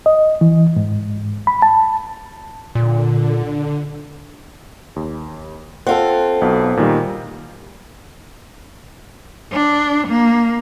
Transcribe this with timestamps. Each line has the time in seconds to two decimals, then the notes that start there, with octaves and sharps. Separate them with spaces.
0.06 D#5
0.41 E3
0.76 G#2
1.47 B5
1.62 A5
2.75 A#2 D3
4.96 D#2
5.87 C4 F4 A4 F#5
6.41 B1 B2
6.77 A#2 D#3 G3
9.53 D4
10.08 A#3